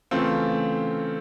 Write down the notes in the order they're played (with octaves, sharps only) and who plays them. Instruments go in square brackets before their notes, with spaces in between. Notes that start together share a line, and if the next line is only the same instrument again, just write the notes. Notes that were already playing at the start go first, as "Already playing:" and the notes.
[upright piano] C#3 E3 A3 C4 F4